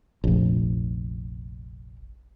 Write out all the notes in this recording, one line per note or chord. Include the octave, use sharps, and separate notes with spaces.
F1 A#1